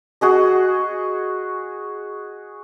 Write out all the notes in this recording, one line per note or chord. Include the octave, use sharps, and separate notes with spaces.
F#4 G#4 D#5